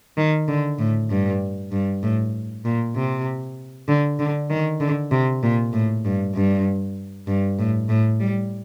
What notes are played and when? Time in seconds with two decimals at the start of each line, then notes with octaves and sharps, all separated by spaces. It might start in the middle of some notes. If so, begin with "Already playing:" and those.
0.17 D#3
0.48 D3
0.79 A2
1.10 G2
1.72 G2
2.03 A2
2.65 A#2
2.96 C3
3.88 D3
4.19 D3
4.50 D#3
4.81 D3
5.11 C3
5.43 A#2
5.73 A2
6.05 G2
6.35 G2
7.27 G2
7.59 A2
7.89 A2
8.20 G3